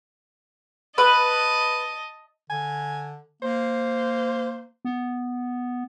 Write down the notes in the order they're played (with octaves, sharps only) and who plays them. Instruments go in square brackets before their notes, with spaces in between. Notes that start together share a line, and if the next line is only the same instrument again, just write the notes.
[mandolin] B4 [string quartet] D#5 A5
[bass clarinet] D3 [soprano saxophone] G#5
[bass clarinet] A#3 [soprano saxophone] C5
[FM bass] B3